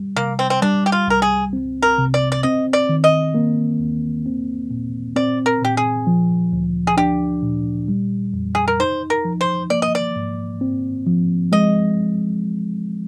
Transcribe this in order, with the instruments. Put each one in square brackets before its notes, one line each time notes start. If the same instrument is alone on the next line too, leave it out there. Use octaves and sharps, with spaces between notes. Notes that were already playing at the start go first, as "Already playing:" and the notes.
Already playing: [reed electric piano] G3
[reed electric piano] C3 [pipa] A#3
[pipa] C4
C4
[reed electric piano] G3 [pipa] D4
[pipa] G4
F4
[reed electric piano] C2 [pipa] A#4
[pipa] G#4
[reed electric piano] C4
[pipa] A#4
[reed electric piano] C3
[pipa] D5
D5
[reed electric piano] C4 [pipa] D#5
[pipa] D5
[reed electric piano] D#3
[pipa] D#5
[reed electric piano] A#3
D#2
C4
A#2
[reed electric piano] C4 [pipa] D5
[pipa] A#4
[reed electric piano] A#2 [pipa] G4
[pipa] G#4
[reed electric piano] F3
D2
[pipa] G#4
[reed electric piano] D4 [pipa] G4
[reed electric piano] A#2
G3
F2
[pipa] G#4
A#4
[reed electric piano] D#4 [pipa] C5
[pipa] A#4
[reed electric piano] F3
[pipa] C5
[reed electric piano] A#3 [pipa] D5
[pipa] D#5
D5
[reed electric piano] G#2
C4
F3
[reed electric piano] G#3 [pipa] D#5